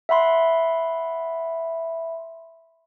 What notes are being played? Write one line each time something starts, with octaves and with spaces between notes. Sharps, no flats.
E5 F#5 B5 C6